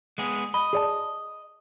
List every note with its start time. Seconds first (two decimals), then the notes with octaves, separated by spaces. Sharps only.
0.18 G#3 B3 G#4
0.54 D#5 B5
0.73 G#4 D5 A5